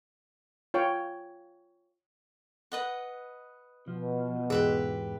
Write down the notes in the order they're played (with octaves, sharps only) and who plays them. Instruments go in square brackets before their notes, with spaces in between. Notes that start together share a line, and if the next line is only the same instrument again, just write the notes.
[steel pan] F4 C#5 G5
[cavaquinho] B4 D#5 F#5
[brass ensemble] B2 [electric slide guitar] F3
[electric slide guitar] E2 G#2 [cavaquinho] G4 B4 E5 [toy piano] G#4